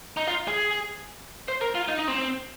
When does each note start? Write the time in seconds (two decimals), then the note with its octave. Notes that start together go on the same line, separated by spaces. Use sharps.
0.17 D#4
0.27 F4
0.48 G#4
1.48 C5
1.61 A#4
1.75 F4
1.88 D#4
1.99 D#4
2.08 C4